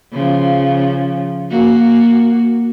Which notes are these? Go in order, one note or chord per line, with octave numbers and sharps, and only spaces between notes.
C#3 F3
A#3 F#4